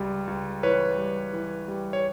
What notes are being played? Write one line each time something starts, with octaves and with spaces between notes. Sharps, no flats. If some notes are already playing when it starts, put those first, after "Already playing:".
Already playing: C#2 G3
C#2
E3 B4 C#5
G3
E3
G3
C#5